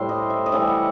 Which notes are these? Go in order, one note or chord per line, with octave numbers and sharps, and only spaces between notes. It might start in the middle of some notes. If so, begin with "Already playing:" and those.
Already playing: A2 G3 C5
D#5
E5
D#5
A2 E3 G3 E5
F#5